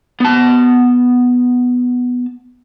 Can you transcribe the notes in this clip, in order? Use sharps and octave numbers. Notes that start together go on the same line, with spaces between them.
B3 A5